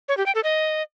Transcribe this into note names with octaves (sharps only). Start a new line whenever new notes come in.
C#5
G4
G5
A4
D#5